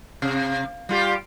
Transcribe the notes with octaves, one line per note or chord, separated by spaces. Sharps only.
C3
G3 F4 G4